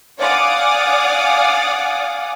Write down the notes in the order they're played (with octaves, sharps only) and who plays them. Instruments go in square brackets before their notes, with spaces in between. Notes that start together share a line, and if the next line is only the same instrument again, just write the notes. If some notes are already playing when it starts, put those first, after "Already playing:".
[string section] D5 F5 F#5 G#5 D6 D#6